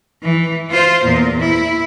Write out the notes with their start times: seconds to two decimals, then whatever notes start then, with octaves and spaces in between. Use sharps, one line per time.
0.22 E3
0.70 F4 C5
1.04 E2 A#2
1.40 E4